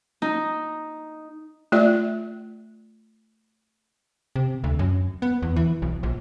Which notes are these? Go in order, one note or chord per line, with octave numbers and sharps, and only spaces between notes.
D#4
A3 F4 D5 E5
C3
D2
F#2
B3
E2
E3
B1
A#1